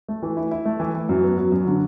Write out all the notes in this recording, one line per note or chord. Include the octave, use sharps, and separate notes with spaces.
A3
E3
E4
E4
A3
E3
E3
F#2
B3
F#3
F#2
D3